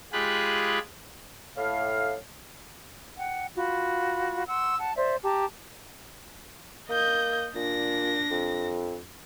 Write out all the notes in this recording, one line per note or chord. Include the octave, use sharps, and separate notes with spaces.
G#3 F4 G4 G#4 B5 F#6
A2 F5
F#5 G5
F4 F#4 B5
F#5 C6 E6
F#5 A5
C5 D5 E5
G4 A5 A#5
A#3 D#5 G6
A#2 D4 A#6
F2